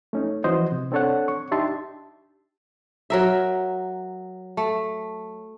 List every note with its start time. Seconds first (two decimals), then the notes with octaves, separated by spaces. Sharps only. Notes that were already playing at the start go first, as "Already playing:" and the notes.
0.13 A3 C#4 D#4
0.44 E3 F3 F#4 C5 D#5
0.72 C3
0.92 C4 D4 A4 C#5 F#5
1.28 C#6
1.52 D4 D#4 G4 E5 A5 C6
3.10 F#3 A#4 E5
4.57 A3